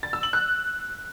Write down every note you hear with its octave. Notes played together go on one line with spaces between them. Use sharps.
A6
E6
F#7
F#6